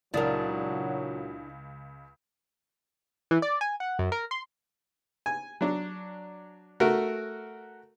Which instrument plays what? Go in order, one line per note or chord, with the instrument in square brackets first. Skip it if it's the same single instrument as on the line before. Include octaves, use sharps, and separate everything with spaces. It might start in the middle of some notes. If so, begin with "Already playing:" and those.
[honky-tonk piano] C#2 [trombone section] A#2 F#3 [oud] D4 A#4 [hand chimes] E4 D#6
[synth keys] E3
D5
G#5
F#5
F#2
A#4
C6
[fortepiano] G#5
F#3 D4
A3 F#4 A#4